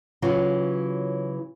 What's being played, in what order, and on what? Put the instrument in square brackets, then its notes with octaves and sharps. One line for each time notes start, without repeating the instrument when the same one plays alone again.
[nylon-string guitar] C#3 E3 F#3 F4 F#4